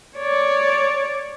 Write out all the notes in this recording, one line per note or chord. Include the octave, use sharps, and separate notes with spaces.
C#5 D5